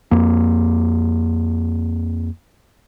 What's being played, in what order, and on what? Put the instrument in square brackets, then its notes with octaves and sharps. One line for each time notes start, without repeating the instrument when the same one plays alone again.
[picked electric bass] F2 A#3